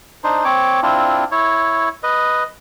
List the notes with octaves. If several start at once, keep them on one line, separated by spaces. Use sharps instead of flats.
D4 D#4 C5
C4 C#5 D6
C4 D4 E4 F4
E4 C#5
B4 D#5